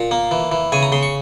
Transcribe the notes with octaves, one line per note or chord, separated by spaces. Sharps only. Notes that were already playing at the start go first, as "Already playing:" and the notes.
Already playing: A#2 A#5
A#3
E3
E3
C#3 G#5
A#5
C#3 C6
C#6